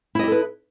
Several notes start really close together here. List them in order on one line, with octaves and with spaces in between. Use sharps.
E4 D#5 G4 A4 B4